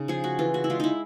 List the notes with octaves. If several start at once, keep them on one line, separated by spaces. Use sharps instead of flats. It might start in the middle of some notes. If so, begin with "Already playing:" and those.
Already playing: C#3 D#4
F3 G#4
F#4
E3 F4
F#4
E4
G#3 F4
D#4 E4